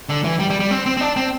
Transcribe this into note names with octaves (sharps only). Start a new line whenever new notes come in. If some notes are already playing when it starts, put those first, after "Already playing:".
D3
E3
G3
G3
G3
C4
C4
C4
D4
C4